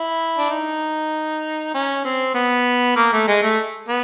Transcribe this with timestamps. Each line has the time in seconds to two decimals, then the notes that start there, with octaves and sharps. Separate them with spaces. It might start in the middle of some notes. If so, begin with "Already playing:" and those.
Already playing: E4
0.38 D4
0.50 D#4
1.74 C#4
2.04 C4
2.35 B3
2.96 A#3
3.13 A3
3.27 G#3
3.42 A3
3.88 B3